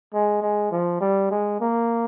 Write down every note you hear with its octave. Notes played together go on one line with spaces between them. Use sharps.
G#3
G#3
F3
G3
G#3
A#3